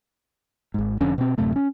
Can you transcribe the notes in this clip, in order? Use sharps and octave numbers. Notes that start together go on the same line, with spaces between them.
G#1 G#2
F1 F2 D3 C#4
B2 C4
D1 F#2 C3 A3
C#4